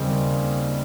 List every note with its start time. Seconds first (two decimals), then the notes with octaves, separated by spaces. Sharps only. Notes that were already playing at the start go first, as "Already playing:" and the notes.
Already playing: D#2 C#3 G3 C4 D#5